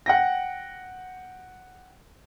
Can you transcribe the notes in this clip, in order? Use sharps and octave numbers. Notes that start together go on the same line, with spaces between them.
F#5 G5 A#6